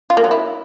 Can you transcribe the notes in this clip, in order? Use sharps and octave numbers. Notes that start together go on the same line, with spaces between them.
F4
A#3
F#3
E4